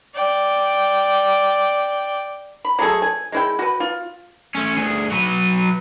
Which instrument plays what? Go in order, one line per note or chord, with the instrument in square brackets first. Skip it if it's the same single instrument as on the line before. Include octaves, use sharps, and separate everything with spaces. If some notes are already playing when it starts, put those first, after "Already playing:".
[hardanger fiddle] D5 G5
[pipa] B5
F#3 A3 G#4 A4
G#5
G#3 E4 G5
F#4 B4
F4
[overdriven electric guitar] A3 C#4
D2 G#4
F#3 B4